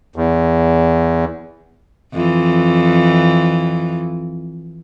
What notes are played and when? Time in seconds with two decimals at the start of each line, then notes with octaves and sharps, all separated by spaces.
0.16 E2
2.13 F2 E3